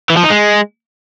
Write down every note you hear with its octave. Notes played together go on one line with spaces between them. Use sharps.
E3
F3
D#4
G#3